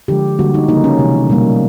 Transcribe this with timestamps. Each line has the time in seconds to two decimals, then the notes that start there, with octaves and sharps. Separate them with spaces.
0.08 D3 F3 G#3 G4
0.38 D3 G3 A#3 F#4
0.54 D#4
0.68 C#3 F3 A#3 D#4
0.84 C#4
0.99 C3 E3 G#3
1.30 B2 G3 A#3